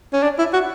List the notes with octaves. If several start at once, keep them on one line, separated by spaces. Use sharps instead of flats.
C#4
D4
E4
F#4